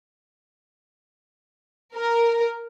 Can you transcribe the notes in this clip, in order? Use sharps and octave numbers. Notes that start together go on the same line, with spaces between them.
A#4